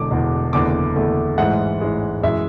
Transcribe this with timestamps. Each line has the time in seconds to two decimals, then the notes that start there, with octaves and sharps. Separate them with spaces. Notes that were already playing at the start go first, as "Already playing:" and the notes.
Already playing: E1 E2 D3 D6
0.11 E1 E2 D3
0.53 F#1 E2 D3 A3 D6
0.96 F#1 E2 D3 A3
1.38 A1 G#2 E3 G#3 F#5
1.81 A1 G#2 E3 G#3
2.23 F#2 E3 G#3 E5